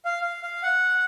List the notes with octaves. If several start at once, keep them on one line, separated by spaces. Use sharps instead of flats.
F5
F5
F5
F#5